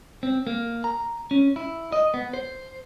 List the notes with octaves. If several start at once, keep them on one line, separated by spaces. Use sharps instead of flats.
C4
A#3
A#5
C#4
E4
D#5
B3
C5